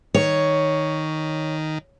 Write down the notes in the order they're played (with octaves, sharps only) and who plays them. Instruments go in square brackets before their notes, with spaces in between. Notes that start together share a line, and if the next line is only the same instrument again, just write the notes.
[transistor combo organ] D#3 [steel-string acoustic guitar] C#5